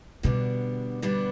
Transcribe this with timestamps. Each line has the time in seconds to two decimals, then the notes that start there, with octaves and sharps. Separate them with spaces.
0.23 B2 D3 G3 B3 D4
1.02 D3 G3 B3 D4